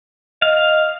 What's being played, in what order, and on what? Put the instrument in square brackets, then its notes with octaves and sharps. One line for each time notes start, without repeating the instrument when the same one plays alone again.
[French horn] D#5 [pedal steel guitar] F5